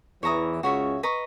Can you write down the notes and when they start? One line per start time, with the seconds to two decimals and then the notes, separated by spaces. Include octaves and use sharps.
0.23 E2 E3 C#5 E5 A#5 D#6
0.63 C#2 C#3 F#4 C#5 E5
1.03 B4 D#5 A#5 C#6